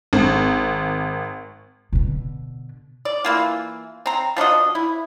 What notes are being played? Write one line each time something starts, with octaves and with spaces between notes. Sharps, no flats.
G#1
B2 D3
D5
E3 A#3 F4
C4 A#5
F3 D4 F#4 D#5
E4